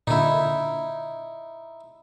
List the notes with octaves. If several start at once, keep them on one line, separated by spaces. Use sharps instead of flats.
A#2 D3 D#4 E4